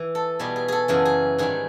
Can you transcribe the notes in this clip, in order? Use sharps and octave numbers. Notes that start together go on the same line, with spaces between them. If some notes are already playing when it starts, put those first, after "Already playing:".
Already playing: E3
A4
B2 G3 G#4
G#4
G#4 A4
F#2 C#3 E3 G#4
G#4
G#2 D#3 G3 G#4